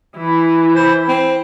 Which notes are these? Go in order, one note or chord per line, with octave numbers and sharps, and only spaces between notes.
E3 E4
C5
C4